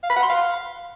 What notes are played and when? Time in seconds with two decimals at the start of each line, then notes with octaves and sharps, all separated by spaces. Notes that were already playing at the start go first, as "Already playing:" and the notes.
0.03 F5
0.10 B5
0.16 F#5
0.23 C6
0.30 F5